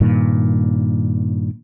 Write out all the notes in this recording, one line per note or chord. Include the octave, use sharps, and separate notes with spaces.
G2 A#2 D#3